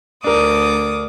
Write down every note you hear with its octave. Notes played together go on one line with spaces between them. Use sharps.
D2 D4 A#4 D6 D#6